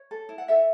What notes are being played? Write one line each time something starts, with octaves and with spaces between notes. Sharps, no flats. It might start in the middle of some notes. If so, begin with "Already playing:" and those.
Already playing: C#5
A4
E4
F#5
A4 E5